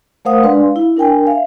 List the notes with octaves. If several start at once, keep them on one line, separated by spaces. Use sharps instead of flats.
A3 A#4 C5 F5 F#5 D#6
G#3 D4 B4 D5 C6
F5
E4
D4 A#4 G5 G#5
E5 F5